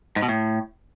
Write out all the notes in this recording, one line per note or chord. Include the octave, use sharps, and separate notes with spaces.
G#2
B2
A2